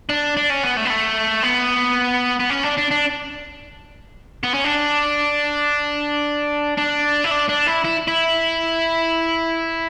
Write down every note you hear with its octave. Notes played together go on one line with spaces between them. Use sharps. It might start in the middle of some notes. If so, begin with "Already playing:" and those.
D4
D4
C#4
B3
A3
B3
A3
B3
B3
C#4
D4
D4
D4
B3
C#4
D4
D4
E4
D4
D4
E4
E4
E4